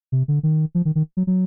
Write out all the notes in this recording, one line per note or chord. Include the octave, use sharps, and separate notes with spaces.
C3
D3
D#3
F3
D#3
D#3
F#3
F#3